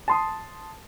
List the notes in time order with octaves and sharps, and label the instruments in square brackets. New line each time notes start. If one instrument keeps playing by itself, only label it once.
[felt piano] A5 C6 D#6